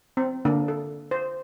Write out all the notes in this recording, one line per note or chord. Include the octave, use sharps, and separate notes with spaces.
C4
D3 A#3 D4
A4
C5